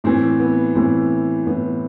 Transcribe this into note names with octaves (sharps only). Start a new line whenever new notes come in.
A2 E3 C4
B3
A2 E3 C4
A2 E3 B3